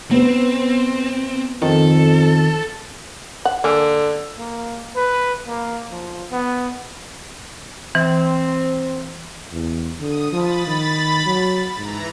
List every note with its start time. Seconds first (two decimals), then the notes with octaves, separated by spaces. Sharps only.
0.11 B3 C4 B4
1.62 F2 D#3 A4
3.45 F#5
3.64 D3 A#3 G#4
4.38 A#3
4.96 B4
5.47 A#3
5.90 F3
6.32 B3
7.95 E3 C4
9.53 E2
10.00 D3 D#6
10.33 F3 B5 A6
10.67 D#3
11.26 F#3
11.77 G#2 E3 A#5